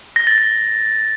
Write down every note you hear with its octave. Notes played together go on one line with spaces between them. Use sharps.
A#6
A6
A#6